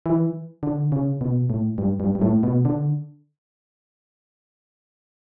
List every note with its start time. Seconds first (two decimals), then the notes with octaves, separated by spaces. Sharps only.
0.06 E3
0.63 D3
0.92 C#3
1.21 B2
1.50 A2
1.78 G2
2.00 G2
2.15 G2
2.22 A2
2.43 B2
2.65 D3